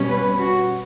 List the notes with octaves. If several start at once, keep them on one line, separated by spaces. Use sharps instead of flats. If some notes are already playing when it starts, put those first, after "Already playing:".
Already playing: B2 G3 C#4
B4
F#4